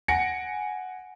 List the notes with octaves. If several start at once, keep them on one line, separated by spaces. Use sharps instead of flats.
F#5 G#5 A#6 C#7 D7